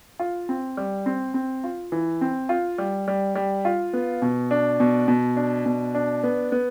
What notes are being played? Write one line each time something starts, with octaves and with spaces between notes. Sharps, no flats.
F4
C4
G3
C4
C4
F4
E3
C4
F4
G3
G3
G3
F4
B3
B2
D4
B2
B2
D4
B2
D4
B3
B3